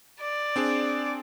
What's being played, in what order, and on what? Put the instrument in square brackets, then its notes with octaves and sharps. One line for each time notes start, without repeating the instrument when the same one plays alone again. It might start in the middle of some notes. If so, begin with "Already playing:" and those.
[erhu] D5
[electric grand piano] C4 D4 G#4